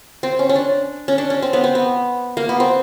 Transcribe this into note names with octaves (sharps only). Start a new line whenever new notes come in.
C4
C#4
C#4
D4
C#4
D4
C#4
C4
B3
C4
B3
A#3
B3
C4